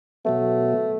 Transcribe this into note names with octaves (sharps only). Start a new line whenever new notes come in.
B2 F#3 A3 B3